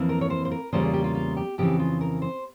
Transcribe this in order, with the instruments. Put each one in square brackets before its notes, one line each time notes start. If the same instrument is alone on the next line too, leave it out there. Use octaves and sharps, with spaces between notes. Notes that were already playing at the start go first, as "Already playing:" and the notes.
Already playing: [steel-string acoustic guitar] F2 E3 A#3
A#4
C#5
C5
C5
A#4
E2 C#3 G3 A#3 F4 C5
G#4
G4
F4
F4
G4
F2 C#3 E3 G4
F4
A#4
C5